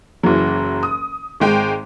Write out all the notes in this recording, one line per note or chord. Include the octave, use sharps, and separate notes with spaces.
F#1 E3 F#3
D#6
G#1 G#3 G5